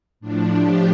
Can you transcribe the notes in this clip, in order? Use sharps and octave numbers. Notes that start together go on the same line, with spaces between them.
A2 F3 D4
G4